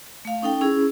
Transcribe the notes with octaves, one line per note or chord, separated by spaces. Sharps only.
A3 F5
C#4 D#4 A4 G5
C#4 E4 G#4